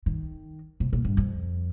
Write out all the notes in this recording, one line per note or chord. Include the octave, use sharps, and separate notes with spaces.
D#3
C3
A#2
G2
F2